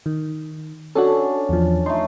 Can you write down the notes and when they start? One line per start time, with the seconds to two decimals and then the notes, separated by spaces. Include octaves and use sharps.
0.06 D#3
0.95 C#4 D4 F#4 A4
1.49 E2 F3
1.86 A3 D#4 C6